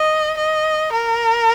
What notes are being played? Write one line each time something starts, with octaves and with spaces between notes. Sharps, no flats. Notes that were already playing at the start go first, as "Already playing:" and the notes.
Already playing: D#5
D#5
A#4